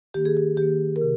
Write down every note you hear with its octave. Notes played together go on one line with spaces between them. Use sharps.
D#3 A#3 G4
G#4
G4
D#3 A#3 G4
A#4
C3